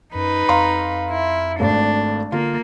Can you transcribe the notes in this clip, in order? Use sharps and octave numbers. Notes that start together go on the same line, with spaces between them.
F#2 D#4 B4
F2 F5 A#5 C6
E4
G#1 A3 D4
D3 A#3 F4